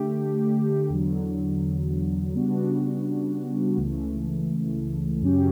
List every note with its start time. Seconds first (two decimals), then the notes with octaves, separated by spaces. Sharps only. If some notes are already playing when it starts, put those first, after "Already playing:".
Already playing: D3 A3 G4
0.89 E2 D3 F#3
2.33 C#3 G3 B3 D4 F#4
3.77 C#2 C#3 E3 A3
5.21 F#2 C#3 F#3 C#4 G4